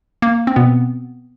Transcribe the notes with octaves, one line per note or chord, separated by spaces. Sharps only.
A#3
C4
B2 B3